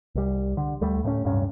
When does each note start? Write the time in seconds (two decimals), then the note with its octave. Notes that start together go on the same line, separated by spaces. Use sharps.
0.15 C2 G3
0.57 D3
0.81 D2 G3 A3
1.04 A2 A3 B3 C#4
1.25 D1 G2 C3 C#4